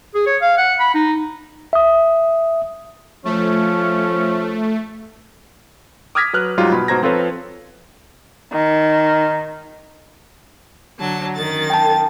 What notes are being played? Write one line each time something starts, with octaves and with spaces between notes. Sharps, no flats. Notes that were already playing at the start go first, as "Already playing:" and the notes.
G#4
C#5
F5
F#5
B5
D#4
E5 D#6
F3 A3 C#4
D6 D#6 F6 G#6 A#6 B6
F#3 B4 F6 F#6
G#2 F#3 G3 F4 G4
B2 B5
G#2 B2 C5 A#5 G#6 A#6
F3 C4 F4 A4 B4 C#5
D#3
D3 F#3 A5
F#2 D#3 A6
G5 A5